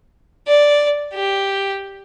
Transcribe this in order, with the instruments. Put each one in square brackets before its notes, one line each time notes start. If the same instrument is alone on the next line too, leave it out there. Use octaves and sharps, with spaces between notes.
[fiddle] D5
G4